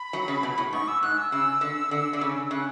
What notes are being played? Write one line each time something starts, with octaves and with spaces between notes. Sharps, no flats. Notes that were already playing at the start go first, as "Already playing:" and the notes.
Already playing: B5
F#3
C#3
B2
A2
G#2 C#6
E6
G#2 F#6
E6
C#3 E6
D3
D3
D3
C#3
C#3 F#6